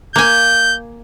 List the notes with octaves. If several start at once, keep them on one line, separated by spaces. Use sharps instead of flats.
A#3 G#5 G6